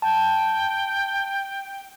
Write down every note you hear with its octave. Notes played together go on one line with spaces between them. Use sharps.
G5 A5